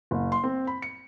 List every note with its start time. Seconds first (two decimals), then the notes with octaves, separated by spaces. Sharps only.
0.11 F#1
0.32 C6
0.44 C4
0.67 B5
0.82 C#7